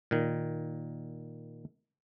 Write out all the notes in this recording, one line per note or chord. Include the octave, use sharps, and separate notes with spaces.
A#2 D#3